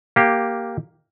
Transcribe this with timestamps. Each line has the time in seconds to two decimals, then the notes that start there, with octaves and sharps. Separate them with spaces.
0.16 A#3 G4